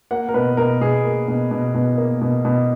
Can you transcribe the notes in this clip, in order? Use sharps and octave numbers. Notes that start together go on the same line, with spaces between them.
A#3 F#5
A#4
B2 B4
B2 A#4
B2 G#4
A#3
B2
B2
B2
A#3
B2
B2